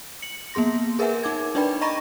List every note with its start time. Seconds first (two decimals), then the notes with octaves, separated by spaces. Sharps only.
0.22 C#7 F#7
0.54 A#3 B3 G#4 C6 A#6
0.99 G#4 A#4 B4 E5 F#5 G#5
1.23 D#4 D6 G#6
1.55 D4 D#4 B4 D5 G5 B5
1.81 D#5 A#5 B5 C#6 A#6 D#7